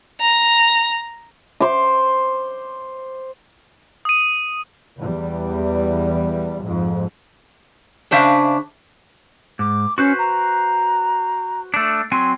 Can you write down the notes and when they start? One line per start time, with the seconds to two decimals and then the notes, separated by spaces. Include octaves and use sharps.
0.20 A#5
1.60 C5 D6
4.05 D#6 D#7
4.99 E2 G3
6.64 F2 G#2
8.11 C#3 D4 C5 E5 F5
9.59 G#2 D6
9.98 C#4 F#4 B4 C5
10.19 A#5
11.74 A3 D4
12.12 F#3 C4 G#5 C6